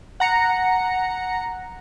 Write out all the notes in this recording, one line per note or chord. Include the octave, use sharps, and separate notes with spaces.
F#5 A#5 C#7